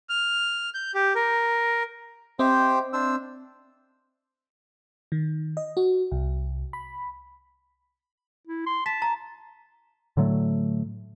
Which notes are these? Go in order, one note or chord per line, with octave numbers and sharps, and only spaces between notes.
F6
G6
G4
A#4
C4 G4 C5 D#5 E5 G5
D4 C5 E6
D#3
D#5
F#4
C2
B5
E4
C6
A5 B6
A#5
A2 D3 F#3 A3